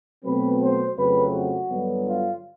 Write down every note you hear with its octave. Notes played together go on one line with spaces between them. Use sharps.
B2 F#3 A3 C4 B4
C5
F2 C#3 F#3 A3 C4 B4
F#4
G2 D3 F#3 B3
F4